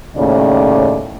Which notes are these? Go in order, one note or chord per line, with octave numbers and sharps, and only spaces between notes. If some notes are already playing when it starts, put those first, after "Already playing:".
D#2 A2 C#3 D5